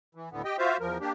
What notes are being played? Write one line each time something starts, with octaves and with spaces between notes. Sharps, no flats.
E3
D2 A2 D3 B3
G4 D#5 G5
F4 F#4 C5 E5 F5
E2 F3 A#4
A#3 D4 G4